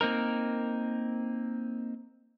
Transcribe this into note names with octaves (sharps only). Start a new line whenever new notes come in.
A#3 C4 D#4 A#4